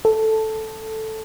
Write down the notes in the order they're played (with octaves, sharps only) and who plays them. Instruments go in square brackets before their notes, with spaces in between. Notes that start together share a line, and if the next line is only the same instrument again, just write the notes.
[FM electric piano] A4